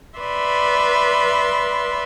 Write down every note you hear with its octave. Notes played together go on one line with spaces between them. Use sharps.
B4 D5 E5 C6